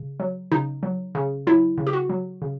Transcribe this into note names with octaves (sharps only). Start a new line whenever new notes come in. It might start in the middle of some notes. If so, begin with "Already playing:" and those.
Already playing: C#3
F#3
C#3 D#4
F#3
C#3
F#3 E4
C#3
G4
F#4
F#3
C#3